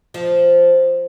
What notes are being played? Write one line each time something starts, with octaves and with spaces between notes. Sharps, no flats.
F3